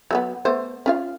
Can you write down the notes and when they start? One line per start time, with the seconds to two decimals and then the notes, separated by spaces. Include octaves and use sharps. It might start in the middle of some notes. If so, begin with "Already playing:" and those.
0.11 F#3 A#3 B3
0.45 A3 B3 C5
0.86 C#4 F4 F5